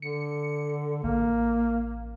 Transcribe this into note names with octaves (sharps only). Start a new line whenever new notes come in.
D3 C#7
A1 A#3